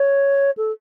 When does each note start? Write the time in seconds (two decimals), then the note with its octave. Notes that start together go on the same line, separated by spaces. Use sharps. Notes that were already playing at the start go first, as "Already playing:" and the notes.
Already playing: C#5
0.57 A4